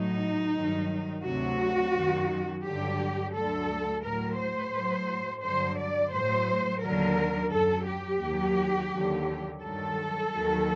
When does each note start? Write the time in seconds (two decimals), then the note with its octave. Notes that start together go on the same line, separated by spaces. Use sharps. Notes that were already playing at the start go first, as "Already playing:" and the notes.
Already playing: A2 F#3 D#4
0.55 G2 D#3 F#3
1.24 D2 C3 F#3 F#4
1.94 F#2 D#3 F#3
2.64 G2 D3 F#3 G4
3.33 D2 D3 F#3 A4
4.03 A2 F#3 A#4
4.38 C5
4.73 A2 F#3
5.43 G2 D3 F#3 C5
5.78 D5
6.12 A2 F#3 C5
6.82 D#2 D3 F#3 A#4
7.52 F#2 F#3 A4
7.87 G4
8.22 D#2 D#3 F#3
8.91 D#2 D3 F#3
9.61 G2 D#3 F#3 A4
10.31 D#2 D#3 F#3